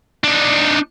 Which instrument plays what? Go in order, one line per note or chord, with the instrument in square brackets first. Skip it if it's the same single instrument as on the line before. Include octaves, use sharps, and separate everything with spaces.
[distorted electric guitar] D4 D#4